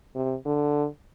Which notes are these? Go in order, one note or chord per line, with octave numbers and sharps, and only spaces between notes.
C3
D3